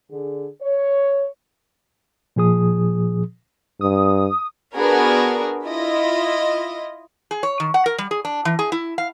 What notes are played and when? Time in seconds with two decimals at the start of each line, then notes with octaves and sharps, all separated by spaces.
0.10 D3 G#4
0.60 C#5
2.36 A#2 F3 G#4 D#6
3.81 G2 D#6
4.76 B3 D4 F#4 G#4 A#4
5.66 E4 F4 D#5
7.31 G#4
7.43 C#5
7.60 D#3
7.74 F#5
7.86 A#4
7.98 G3
8.11 G#4
8.25 D4
8.45 E3
8.59 G#4
8.72 E4
8.98 F5